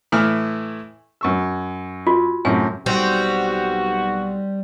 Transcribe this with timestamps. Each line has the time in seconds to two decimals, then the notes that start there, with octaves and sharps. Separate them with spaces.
0.12 A2 E3 F6
1.21 F#2 C#6 E6
2.07 F4 F#4
2.45 F#2 A2 C3 G#5
2.86 B1 G3 C4 F#4